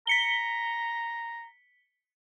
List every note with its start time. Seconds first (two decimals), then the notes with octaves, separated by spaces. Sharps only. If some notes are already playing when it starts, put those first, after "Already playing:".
0.07 A#5 B6 C#7 G7